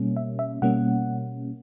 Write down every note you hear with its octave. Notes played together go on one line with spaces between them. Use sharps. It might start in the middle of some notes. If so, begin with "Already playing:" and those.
Already playing: B2 G3 A#3 C#4
E5
E5
B2 G3 A#3 C#4 F#5